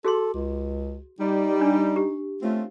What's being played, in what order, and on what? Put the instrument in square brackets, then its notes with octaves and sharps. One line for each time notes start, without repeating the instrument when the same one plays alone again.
[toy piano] F#4 G#4 C6 [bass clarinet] A4
[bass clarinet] C#2
[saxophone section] G3 [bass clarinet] D#4
[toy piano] D4
G4
[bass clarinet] A3 [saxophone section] C4 C#4 F4